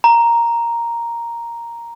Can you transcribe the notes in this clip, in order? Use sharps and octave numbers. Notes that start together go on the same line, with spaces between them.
A#5